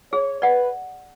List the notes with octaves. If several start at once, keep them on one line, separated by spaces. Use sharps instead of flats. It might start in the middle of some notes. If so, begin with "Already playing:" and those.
G#4 C#5
B4 D5 F#5